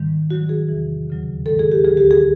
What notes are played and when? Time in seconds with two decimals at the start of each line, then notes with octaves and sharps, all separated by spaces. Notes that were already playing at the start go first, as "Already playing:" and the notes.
Already playing: G#2 D#3 G3
0.30 G#2 D#3 F#3 F#4
0.49 G#4
0.69 E2 C3 E3
1.07 D#2 C#3 F#3
1.46 G#2 D#3 G#3 A4
1.59 G#4
1.72 G4
1.84 D2 D3 F#3 G#4
1.97 G4
2.11 G#4